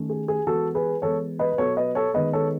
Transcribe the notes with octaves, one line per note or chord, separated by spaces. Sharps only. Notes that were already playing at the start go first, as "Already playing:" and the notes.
Already playing: D#3 A3 C#4
G#4
G#4
E3 G#3 B3 F#4 A4
G#4 B4
E3 G#3 B3 A4 C#5
B4 D#5
B4
B2 F#3 B3 A4 C#5
B4 D#5
A4 C#5
D#3 G#3 B3 B4 D#5
A4 C#5